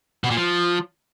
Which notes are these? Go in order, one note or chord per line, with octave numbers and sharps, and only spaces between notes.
B2
A#2
F3